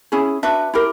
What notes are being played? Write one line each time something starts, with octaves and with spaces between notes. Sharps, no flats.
C#4 E4 G#4
D4 F#4 B4 E5
E4 G4 A#4